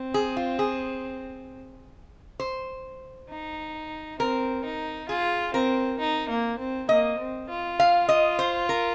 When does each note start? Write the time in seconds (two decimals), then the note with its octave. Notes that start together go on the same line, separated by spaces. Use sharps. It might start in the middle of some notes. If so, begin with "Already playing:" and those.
Already playing: C4
0.14 G#4
0.37 F4
0.59 G#4
2.40 C5
3.30 D#4
4.19 C4 A#4
4.64 D#4
5.09 F4 G#4
5.54 C4 A#4
6.00 D#4
6.30 A#3
6.59 C4
6.89 A#3 D#5
7.19 C4
7.50 F4
7.80 F5
8.09 D#5
8.39 C5
8.69 A#4